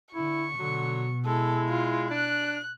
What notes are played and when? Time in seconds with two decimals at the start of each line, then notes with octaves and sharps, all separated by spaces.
0.15 D3 E4 C#6
0.59 B2 D3 F#3
1.26 G#3 E4 A4
1.69 F4
2.11 D4 F#6